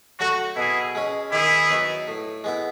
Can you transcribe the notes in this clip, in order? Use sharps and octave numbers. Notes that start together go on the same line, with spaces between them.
F#3 A3 F#4
B2 E4 G#4
G#3 C#4
D#3 E4 G#4
F#3 B3 D#4
A2
G#3 B3 E4